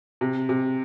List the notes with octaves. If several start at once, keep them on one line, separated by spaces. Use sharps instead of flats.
C3
C3